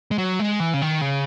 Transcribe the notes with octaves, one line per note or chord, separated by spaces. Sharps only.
G#3
F#3
G#3
E3
C#3
D#3
C#3